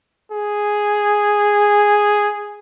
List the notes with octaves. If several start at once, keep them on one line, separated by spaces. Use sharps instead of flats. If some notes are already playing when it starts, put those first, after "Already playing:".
G#4